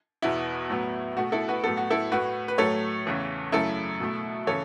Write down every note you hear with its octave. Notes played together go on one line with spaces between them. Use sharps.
E2 B2 B3 E4
A2 F#3 B3
B2 A3 F#4
E4 A4
F#4 B4
A2 F#3 B3 A4
F#4
E4 A4
A2 A3 F#4 B4
B4
A2 F#3 A3 A4 C#5
E2 C#3 E3 A3
F#2 C#3 A3 E4 A4
B2 A3
C#3 E3 A4 C#5